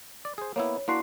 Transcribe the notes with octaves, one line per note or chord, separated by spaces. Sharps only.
D5
G#4 C5
A#3 B3 E4 C#5
A#3 D4 E4 F#4 C6 C7